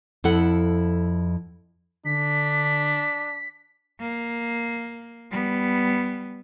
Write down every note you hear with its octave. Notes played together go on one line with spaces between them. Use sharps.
F2 E4 A4 F#5
D3 D4 B6
A#3
G3 B3